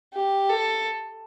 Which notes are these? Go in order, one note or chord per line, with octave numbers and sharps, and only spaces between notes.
G4
A4